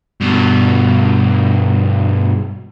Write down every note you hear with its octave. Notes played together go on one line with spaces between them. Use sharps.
G2 B2